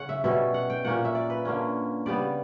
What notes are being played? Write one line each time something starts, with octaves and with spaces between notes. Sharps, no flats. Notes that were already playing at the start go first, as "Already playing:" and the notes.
Already playing: C#3 C#4 F#5
E5
B2 G3 C#4 E5
F#5
G5
A#2 A#3 C#4 F#5
E5
D5
B4
D3 A#3 C#4
C#3 G3 B3 D5